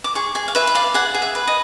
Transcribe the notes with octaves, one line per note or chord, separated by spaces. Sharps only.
D6
G#4 C#6
G#4 G#5
F5
B4 E5
E5
D5 F5
G#4 F#5
G#4
E5
B4
D#5